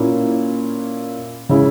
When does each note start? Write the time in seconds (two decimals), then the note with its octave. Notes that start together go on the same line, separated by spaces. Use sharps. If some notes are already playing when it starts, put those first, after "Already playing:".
Already playing: A#2 A#3 C#4 E4
1.49 C#3 G#3 C#4 E4